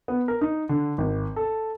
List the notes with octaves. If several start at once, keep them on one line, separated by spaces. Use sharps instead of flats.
B3
A#4
D#4
D3
G#1
A4